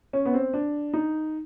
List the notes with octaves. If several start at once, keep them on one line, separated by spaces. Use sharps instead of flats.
C#4
B3
C4
D4
D#4